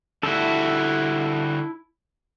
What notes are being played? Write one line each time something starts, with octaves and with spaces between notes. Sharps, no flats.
D3 G3 E4 F#4 A4